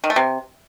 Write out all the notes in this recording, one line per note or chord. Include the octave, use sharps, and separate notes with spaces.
D#3
A3
C3